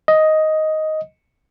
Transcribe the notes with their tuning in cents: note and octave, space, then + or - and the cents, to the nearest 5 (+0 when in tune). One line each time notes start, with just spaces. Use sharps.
D#5 +5